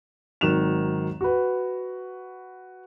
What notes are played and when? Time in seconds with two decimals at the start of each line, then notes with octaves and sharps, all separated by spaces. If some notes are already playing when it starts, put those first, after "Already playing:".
0.41 G#1 D#3 F#3 F#6 E7 F7
1.21 F#4 B4